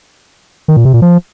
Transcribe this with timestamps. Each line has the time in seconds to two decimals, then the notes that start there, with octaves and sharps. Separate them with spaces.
0.68 D#3
0.77 A#2
0.85 C3
0.93 A#2
1.02 F3